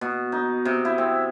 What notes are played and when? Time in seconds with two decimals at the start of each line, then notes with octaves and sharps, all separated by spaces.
0.01 B2
0.32 D#4
0.65 C3
0.85 E4
0.98 C4